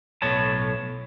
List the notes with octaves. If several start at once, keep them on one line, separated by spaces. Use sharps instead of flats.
B1 A2 C#5 A5